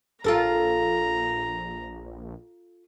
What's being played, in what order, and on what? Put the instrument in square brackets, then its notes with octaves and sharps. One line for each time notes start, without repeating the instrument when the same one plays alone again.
[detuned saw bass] A#1 [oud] F4 A4 A#4 [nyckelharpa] A#5